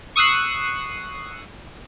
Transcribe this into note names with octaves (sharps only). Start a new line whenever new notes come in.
C#6 D#6 E6 F#6 C7